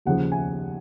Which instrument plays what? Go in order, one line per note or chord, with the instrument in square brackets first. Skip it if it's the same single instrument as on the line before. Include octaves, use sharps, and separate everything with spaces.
[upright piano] D#2 C#3 F3 F#5
G#5